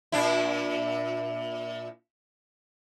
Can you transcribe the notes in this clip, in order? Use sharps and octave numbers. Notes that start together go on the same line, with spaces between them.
A#2 D4 E4